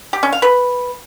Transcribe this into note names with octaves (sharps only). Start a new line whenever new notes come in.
G4
C#4
F5
B4